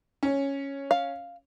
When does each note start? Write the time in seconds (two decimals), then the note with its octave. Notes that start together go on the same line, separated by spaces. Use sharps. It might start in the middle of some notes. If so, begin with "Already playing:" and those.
0.23 C#4
0.91 F5